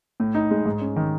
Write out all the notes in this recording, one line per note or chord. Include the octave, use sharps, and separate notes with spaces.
A2
D#4
G#3
G#2
C#4
D#3